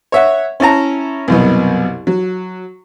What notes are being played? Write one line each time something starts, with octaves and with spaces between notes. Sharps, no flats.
C#5 E5 F#5
C#4 E4 A5 A#5
C2 F#2 B2
F#3